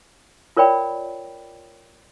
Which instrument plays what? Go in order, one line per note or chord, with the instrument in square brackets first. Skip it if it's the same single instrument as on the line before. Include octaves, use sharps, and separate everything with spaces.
[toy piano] F4 A#4 C#5 D5 G5 B5